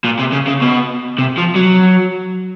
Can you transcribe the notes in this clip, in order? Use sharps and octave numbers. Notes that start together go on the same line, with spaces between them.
A#2
C3
C#3
C#3
B2
C3
F3
F#3